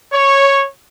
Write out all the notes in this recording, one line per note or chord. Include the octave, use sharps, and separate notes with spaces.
C#5